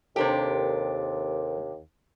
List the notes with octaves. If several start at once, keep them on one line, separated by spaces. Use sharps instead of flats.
D#2 C3 D4 G4 A4 A#4 C5